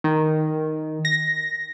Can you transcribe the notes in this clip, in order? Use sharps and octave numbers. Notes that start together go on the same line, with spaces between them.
D#3
A#6